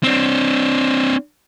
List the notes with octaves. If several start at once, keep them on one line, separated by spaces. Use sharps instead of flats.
C4 D4